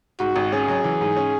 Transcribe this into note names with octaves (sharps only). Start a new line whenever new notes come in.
G#2 F#4
G#1
C#4 G#4
F#3
E3
G#2
C#4